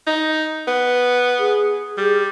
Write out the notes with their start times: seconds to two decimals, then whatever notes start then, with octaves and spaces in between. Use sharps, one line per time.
0.07 D#4
0.68 B3
1.39 G#4
1.98 G3